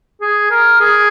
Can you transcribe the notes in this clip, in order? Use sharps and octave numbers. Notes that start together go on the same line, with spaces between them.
G#4
A#4
G#4